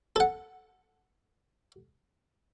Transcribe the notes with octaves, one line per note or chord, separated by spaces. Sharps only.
A4 F#5